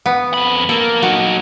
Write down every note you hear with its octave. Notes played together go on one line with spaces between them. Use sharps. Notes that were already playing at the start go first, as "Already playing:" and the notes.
B3
F2 B5
A#3 A4
F#3 D#4 F#4